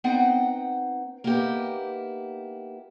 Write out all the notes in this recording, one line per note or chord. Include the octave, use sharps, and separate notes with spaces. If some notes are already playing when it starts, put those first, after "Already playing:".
B3 C4 D#4 F#5 G5
A#3 B3 D#4 E4 G4